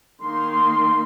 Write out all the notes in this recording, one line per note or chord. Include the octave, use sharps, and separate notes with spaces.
D#3 A#3 D#4 C6